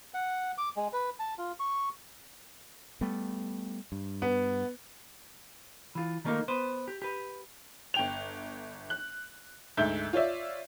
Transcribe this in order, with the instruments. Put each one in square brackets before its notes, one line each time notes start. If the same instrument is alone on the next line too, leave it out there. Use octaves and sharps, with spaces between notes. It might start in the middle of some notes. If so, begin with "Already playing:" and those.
[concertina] F#5
D6
G#3
B4
A5
F4
C#6
[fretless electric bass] G3 A3 B3
G2
[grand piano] B3
[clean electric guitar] E3 F4
D#3 G3 A3 A#3 D#4 F4
B3 B4 C5
G4
G4 B4
[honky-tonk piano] G1 G5 F7
F#6
D2 G#2 E5 G6
F4 C#5 D5 E5